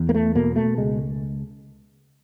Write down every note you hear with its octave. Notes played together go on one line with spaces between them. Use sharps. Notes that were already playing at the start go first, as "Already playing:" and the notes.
Already playing: E2
A#3
A3
B2 A#3
A3
C#2 G#3